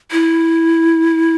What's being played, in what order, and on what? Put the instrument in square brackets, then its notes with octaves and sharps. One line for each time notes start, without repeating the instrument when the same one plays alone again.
[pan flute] E4